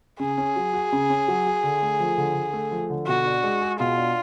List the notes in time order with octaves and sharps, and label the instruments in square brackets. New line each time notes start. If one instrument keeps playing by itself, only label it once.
[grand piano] C#3 [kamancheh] G#4
[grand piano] C#4
F#3
F#4
C#3
C#4
F#3
F#4
D3
A3
F3
D3
D3
A3
F3
D3
[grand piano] B2 [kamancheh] F#4
[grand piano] D4
G#3
G#4
[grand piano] B2 [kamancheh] F4
[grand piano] D4